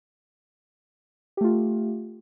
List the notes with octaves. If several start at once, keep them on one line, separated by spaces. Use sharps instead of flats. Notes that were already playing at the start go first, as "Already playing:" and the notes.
A3 F4 G4